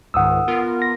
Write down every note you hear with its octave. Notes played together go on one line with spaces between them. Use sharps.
C#2 G#2 D#3 F#5 D#6 E6
B3 F4 A#4
A#6